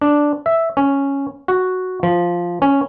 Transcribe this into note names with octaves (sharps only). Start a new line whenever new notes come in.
D4
E5
C#4
F#4
F3
C#4